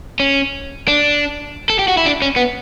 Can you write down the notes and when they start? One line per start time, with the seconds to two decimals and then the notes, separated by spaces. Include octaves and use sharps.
0.20 C#4
0.88 D4
1.70 A4
1.79 G4
1.88 F#4
1.97 E4
2.06 D4
2.22 C#4
2.36 B3